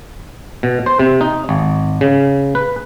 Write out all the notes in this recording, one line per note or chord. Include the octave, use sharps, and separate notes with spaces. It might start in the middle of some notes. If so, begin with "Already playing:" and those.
B2
C5
C3
D#4
G#1
C#3
B4